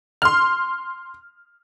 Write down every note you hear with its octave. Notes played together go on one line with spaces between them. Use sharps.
C6 F6